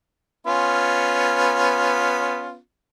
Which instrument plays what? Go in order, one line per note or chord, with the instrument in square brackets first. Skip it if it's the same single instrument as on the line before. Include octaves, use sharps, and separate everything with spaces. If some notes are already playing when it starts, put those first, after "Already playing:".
[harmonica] B3 C#4 F4